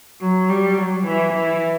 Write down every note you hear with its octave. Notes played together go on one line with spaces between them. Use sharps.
F#3
G3
F#3
E3
E3